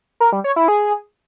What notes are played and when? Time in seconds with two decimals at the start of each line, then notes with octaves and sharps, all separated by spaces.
0.20 A#4
0.32 G3
0.44 C#5
0.56 E4
0.68 G#4